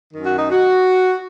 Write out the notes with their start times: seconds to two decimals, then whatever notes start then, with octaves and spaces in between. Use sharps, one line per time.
0.11 F#2 D#3
0.25 F#4
0.39 D#4
0.52 F#4